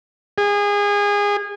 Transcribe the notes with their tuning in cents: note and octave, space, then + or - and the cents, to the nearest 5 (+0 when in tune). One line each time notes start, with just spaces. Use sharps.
G#4 -25